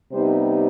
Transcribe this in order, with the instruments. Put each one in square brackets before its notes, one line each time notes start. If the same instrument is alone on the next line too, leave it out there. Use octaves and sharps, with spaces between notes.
[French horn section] C3 G3 B3 D#4 C5